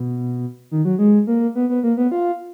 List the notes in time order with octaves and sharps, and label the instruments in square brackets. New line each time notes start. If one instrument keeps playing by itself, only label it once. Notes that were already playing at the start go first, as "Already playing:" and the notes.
Already playing: [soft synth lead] B2
D#3
F#3
G#3
A#3
B3
B3
A#3
B3
F4